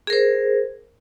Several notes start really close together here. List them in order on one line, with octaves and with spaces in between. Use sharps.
G#4 A#4 C5